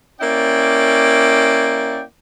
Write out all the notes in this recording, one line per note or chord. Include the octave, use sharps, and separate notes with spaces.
A#3 C#4 E4 D5 G5